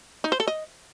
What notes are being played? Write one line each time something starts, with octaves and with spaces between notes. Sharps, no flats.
D#4
C5
A4
D#5